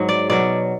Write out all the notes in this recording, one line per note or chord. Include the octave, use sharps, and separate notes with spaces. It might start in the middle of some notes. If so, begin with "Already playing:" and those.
Already playing: G#2 F#3
D5
B2 F#3 D5